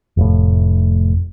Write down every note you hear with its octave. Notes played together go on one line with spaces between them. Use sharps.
F1 A2